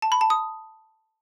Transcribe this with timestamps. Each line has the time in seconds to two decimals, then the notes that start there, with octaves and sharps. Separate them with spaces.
0.02 A5
0.12 B5
0.21 A5
0.30 D#6